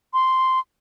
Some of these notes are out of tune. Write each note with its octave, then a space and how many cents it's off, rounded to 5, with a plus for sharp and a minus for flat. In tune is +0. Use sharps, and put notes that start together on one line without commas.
C6 -5